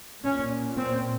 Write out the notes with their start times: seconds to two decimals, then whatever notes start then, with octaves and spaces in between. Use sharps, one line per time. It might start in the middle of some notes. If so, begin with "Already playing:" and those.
0.24 A#2 C#4
0.77 C4